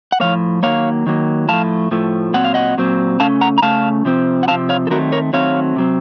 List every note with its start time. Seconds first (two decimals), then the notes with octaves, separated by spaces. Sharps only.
0.12 F#5
0.20 A2 F3 A#3 C#5 F5
0.63 D#3 F#3 A#3 C#5 F5
1.06 D#3 F#3 A#3
1.48 A2 F3 A3 F5 A5
1.91 A2 F3 A3
2.34 A#2 F#3 C4 F#5
2.44 F5
2.54 D#5 F#5
2.78 A#2 F#3 C4
3.20 C#3 A3 C#4 F5 A5
3.41 F#5 A#5
3.58 A#5
3.62 C#3 A3 C#4 F5 A5
4.05 C3 F3 C4
4.43 F#5
4.48 C3 F3 C4 F5 A5
4.69 C#5 F5
4.87 A4
4.90 D#3 F#3 A3 C4 F#4 A#4
5.12 A#4 C#5
5.33 D#3 F#3 A3 C4 C#5 F5
5.76 C3 F#3 C4